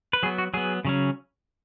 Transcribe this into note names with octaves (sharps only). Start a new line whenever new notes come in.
B4
F#3 B3 G#4
F#4
F#3 B3 G#4
C#3 F#3 C#4